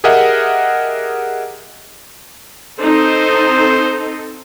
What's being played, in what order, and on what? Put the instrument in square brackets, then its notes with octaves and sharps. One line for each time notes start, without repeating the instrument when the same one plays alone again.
[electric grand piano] G4 G#4 A#4 D#5 E5 F#5
[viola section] C4 D#4 A4 [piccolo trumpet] C5